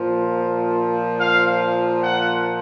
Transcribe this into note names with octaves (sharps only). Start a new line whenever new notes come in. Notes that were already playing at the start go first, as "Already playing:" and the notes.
Already playing: A#2 F3
F5
F#5